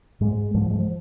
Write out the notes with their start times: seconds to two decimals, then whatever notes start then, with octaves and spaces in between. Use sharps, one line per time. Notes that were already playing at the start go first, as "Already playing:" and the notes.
0.21 G#2 G#3
0.54 G#2 F3
0.70 G#3
0.79 F3